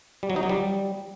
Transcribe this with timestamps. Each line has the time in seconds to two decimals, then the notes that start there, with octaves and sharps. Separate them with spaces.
0.23 G3
0.30 F#3
0.36 D#4
0.43 F#3
0.49 G3